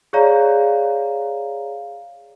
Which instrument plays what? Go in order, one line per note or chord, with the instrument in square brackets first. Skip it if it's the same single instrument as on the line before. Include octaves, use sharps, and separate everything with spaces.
[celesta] G#4 C#5 D5 F5 A#5